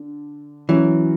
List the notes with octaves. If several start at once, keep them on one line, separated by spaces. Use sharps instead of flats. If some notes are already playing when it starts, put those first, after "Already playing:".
Already playing: D3
E3 F#3 C#4 F#4